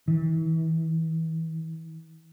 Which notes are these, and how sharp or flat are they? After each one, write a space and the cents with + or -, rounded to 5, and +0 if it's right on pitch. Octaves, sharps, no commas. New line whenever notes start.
E3 -35